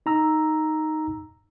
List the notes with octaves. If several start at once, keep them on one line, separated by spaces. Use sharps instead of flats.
D#4 A#5 E6